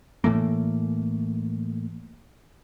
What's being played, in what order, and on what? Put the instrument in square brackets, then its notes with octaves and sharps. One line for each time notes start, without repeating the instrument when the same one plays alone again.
[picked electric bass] A2 E3 A3 A#3